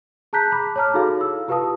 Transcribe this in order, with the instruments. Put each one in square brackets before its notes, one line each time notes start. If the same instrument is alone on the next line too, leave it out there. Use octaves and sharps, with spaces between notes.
[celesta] G#4 A5 A#5 F#6 G6 B6
A5 B5 D6
C#5 A5 A#5 D6 F6
D#4 F#4 G#4 A4 F5
E4 E6
F4 G4 B4 F5 A5 D#6